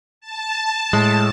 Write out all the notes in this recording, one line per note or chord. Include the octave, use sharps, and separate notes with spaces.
A5
A2 G#3